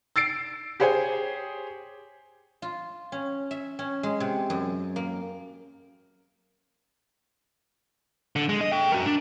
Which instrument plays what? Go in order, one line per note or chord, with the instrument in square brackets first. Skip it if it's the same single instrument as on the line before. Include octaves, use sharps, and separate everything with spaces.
[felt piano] E6 A6 C7 D7
G4 G#4 C5 C#5 G#5
[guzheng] F4
C#4
E5
C#4
G#3
C3
F#2
A#3
[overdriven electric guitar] D3
G#3
D#5
A4 G5
F#4 A#4
D4